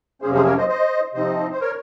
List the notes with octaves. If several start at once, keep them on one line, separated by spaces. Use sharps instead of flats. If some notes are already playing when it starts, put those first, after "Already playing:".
F2 C3 F#3 A#3 C#4 G#4 C5
G#4 C5
A#4 C#5
C5 D#5
C5 D#5
C3 F3 C4 D#4 C5 D#5
C5
A#4 C#5